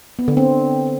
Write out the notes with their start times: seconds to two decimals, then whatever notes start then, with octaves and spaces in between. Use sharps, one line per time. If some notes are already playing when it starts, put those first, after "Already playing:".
0.19 B3
0.28 D3
0.37 C4